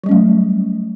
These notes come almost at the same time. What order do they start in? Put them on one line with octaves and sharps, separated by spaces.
F#3 G3 C#4 A3